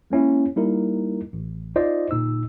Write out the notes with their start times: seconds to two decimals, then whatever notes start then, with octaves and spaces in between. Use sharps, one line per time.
0.10 G#3 A#3 C#4 E4
0.56 G3 A#3 D#4 E4 A#4
1.33 A1
1.76 D#4 F4 C5 D5 D#5
2.11 G1 A#2 D#4 E6